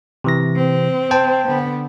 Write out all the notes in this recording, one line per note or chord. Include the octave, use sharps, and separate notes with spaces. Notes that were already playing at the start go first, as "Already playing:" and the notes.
C3 E3 A#6
C4
C5 G5 A5
D3 B3